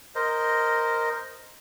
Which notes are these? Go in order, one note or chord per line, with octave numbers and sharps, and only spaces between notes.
A#4 C5 D#5